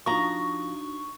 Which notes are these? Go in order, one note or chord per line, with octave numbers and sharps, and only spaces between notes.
F3 D4 D#4 F#4 A#5 C#6